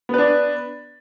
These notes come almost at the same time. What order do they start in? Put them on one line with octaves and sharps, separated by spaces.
B3 B4 D4